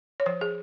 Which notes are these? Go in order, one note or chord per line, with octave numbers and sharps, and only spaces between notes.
C#5
F3 C5
G#4